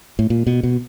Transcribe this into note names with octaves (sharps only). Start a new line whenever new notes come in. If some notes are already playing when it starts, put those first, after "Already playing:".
A2
A#2
B2
B2